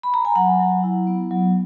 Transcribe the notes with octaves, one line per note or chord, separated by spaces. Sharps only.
B5
A#5
G#5
F#3 F#5
F#3
E4
B3
F#3